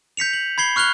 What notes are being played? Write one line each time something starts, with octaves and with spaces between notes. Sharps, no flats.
G6 B6 C#7 F7
F#7
B5 G#6 C7 G7
C#6 F6 F#6 F7 G7